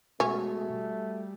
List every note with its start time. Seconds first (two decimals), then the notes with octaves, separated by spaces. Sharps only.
0.20 B2 G#3 A3 C#4 F#4 E5
0.73 G3